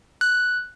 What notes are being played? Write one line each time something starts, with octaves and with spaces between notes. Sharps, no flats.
F#6